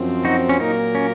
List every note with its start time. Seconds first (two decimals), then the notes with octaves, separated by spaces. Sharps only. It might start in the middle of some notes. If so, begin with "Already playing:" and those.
Already playing: F#2 F3 C4
0.25 D#4 F#4
0.49 C#4
0.60 A#2 F#3 A#3 D#4 F4 A#4
0.95 C#4